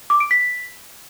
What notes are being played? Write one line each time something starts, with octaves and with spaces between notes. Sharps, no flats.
D6
D7
B6